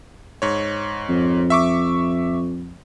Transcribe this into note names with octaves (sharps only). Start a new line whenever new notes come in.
G#2 C#5
F2
E5 C#6 D6